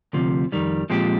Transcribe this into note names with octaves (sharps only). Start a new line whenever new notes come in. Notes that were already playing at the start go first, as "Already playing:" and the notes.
D2 C3 F3
F2 D#3 G3
A#2 F3 G#3 C4 G4